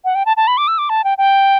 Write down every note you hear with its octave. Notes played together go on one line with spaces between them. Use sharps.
F#5
G5
A5
A5
B5
D6
E6
D6
A5
G5
G5